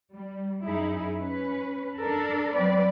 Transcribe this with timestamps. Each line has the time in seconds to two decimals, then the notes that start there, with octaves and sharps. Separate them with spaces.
0.13 G3
0.64 F#2 D#4 E4 G#4
1.17 C#4 B4
1.97 D4 A4 A#4
2.55 F#3 C4 B4 D5